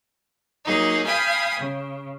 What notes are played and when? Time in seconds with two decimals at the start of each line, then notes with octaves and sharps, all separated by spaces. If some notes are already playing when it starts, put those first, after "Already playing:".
0.65 F#3 A#3 D#4 G#4
1.05 F5 G5 G#5 B5 D#6
1.59 C#3